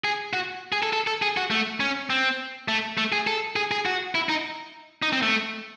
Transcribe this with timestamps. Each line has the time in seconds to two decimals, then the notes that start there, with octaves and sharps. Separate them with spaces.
0.04 G#4
0.33 F#4
0.72 G#4
0.83 A4
0.93 A4
1.07 A4
1.22 G#4
1.37 F#4
1.51 A3
1.80 C#4
2.10 C4
2.68 A3
2.98 A3
3.12 G#4
3.27 A4
3.56 G#4
3.71 G#4
3.86 F#4
4.15 E4
4.29 D#4
5.02 D#4
5.13 C4
5.23 A3